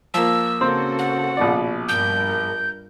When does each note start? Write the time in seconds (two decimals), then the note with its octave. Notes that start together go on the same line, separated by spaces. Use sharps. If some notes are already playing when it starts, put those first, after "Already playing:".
0.14 F3 A#3 E6
0.61 C#3 A#3 C4 F#4 A4 C5
0.99 F#5
1.37 A#1 B2 D5
1.89 G2 A#4 G6